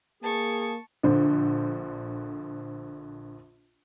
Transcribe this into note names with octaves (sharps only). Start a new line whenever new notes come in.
A#3 G#4 A5 C#6
A#1 D3 C5